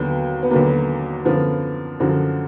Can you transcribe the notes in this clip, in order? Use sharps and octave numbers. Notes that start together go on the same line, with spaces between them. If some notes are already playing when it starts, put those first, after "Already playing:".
Already playing: D#2 D3 F#3 B3
B3
D#2 D3 F#3 A#3
F#2 D3 F3 B3
F#2 D3 F3 F#4